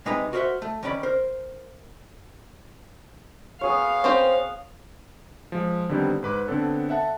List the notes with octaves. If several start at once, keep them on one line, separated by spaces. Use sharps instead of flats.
C3 G#3 D#4 B4 A#5
F#4 A#4 C5 C#5 E5 F#5
A3
D#3 B3 C#4 D5 B5
A#4 C5
B3 G#4 C#5 F5
C4 C#4 C5
F3 G#3
D3 D#3 G3 B3 C4
G#2 B4 D6 F#6
D3 B3 C4 A4 C#5
A4 E5 F#5 A5